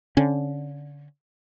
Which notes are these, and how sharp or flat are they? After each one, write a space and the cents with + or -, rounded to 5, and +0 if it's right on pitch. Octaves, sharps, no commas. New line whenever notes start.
D3 -25 C#4 -20